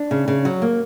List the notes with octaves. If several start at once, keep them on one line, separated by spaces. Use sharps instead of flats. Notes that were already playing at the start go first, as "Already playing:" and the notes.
Already playing: D4
C#3
C#3
F#3
A#3